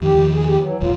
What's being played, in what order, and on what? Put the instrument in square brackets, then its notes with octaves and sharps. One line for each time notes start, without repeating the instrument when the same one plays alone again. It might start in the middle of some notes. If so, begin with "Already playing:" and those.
[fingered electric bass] F2 D#3 [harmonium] G4
[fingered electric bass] E2 D#3 F3
[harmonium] G#4
G4
E3 F#3
[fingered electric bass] D#1 G#1 E2 [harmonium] F#3 F4